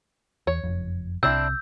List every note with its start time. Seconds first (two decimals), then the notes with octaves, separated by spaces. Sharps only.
0.47 E2 C#5
0.64 F#1 F2
1.23 C2 C3 C4 D4 E4 E6 G6